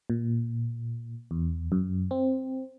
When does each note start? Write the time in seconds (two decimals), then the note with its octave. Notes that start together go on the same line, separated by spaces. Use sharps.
0.10 A#2
1.31 E2
1.72 F#2
2.11 C4